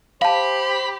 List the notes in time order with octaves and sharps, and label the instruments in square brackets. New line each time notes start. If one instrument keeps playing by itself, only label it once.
[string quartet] G4 [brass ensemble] C5 [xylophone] F5 A5 [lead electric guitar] B5